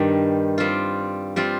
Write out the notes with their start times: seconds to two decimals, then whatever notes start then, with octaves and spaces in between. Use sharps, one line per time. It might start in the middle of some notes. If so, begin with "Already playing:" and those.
Already playing: G2 D#3 G3
0.58 G3 C4 F4
1.36 G3 C4 F4